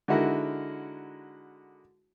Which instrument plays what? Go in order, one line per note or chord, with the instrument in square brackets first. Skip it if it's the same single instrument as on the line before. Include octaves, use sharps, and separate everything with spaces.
[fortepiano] D3 G#3 D#4 E4 F#4 A#4